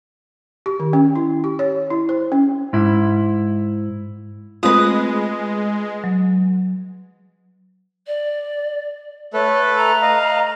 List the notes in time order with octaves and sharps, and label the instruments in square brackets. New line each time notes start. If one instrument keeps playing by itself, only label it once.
[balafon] G4
D#3
C#4
E4
G4
C#5
E4
C5
C#4
[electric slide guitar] G#2 E4
[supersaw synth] G#3 [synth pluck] A3 C4 F4 [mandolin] B4 D#6
[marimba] F#3
[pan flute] D5
[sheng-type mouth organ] A3 A4 B4 [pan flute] C#5
[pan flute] A#5
[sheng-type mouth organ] D#5 F5